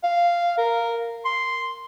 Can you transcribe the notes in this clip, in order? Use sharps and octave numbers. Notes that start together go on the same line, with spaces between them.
F5
A#4
C6